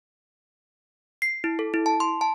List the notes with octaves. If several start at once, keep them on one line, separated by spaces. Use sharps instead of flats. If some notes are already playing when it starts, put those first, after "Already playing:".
C7
E4
A4
E4
A5
C6
A5